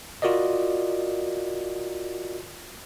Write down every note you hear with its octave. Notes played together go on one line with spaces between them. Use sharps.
F4 F#4 A#4 D5 D#5